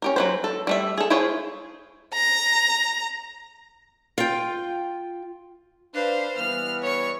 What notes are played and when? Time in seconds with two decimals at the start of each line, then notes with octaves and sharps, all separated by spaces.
0.02 C#4 G4 A#4
0.16 F#3 B4 C5
0.44 A4
0.67 G3 A3 E5
0.98 G#4 A4
1.10 E4 F4 G#4 C5 C#5
2.14 A#5
4.18 F4 G5
5.94 D4 B4 C5 F5
6.38 E3 G3 B3 F6
6.82 C#5 C#6